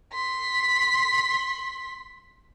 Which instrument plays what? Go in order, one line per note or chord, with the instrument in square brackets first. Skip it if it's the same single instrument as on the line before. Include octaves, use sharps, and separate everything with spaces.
[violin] C6 B6